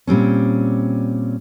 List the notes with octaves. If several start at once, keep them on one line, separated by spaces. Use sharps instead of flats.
A#2 G3 C4 C#4